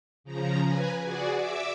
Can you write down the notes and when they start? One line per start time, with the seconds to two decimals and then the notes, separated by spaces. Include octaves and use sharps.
0.24 C#3 F3 A#5
0.63 B4 G#5
1.01 F#4 G#4 D5
1.37 E5 D6 E6